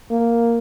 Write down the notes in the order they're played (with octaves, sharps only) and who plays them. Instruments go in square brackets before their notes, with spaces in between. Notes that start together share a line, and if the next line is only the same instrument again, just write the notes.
[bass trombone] A#3